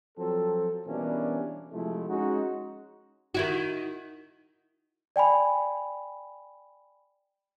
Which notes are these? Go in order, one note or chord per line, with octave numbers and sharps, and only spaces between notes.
F3 F#3 C4 A4
B2 E3 G3 A#3 C#4 D4
C3 F3 G#3 A3 E4
G#3 C#4 D#4 F#4
D#3 E4 F#4
D5 G5 G#5 B5